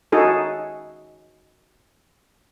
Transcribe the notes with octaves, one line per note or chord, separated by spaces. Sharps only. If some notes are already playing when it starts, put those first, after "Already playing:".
D#4 F#4 G#4 A4